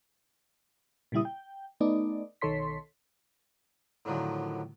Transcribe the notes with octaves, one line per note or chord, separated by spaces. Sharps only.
A#2 C#3 G3 E4 D#6
G5
A3 B3 D#4 D5
B1 D#3 A4 C#5 C6 B6
A2 D3 D#3 F3 F#3